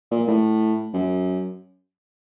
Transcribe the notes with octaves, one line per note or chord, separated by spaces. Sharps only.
A#2
A2
F#2